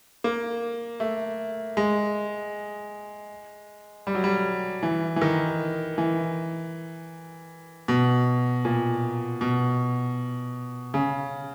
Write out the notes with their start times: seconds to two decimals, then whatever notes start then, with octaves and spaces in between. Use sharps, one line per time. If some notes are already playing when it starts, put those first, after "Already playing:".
0.24 A#3
1.00 A3
1.77 G#3
4.07 G3
4.15 F#3
4.24 G3
4.83 E3
5.16 E3
5.21 D#3
5.98 E3
7.88 B2
8.65 A#2
9.41 B2
10.94 C#3